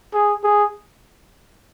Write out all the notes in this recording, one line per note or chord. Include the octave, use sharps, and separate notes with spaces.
G#4
G#4